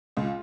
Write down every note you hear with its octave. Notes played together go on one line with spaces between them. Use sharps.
C#2 F4